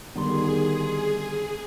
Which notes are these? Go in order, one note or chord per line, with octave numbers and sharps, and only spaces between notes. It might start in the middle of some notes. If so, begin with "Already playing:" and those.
D3 D#3 G3 B3 D4 D#4 G#4 C6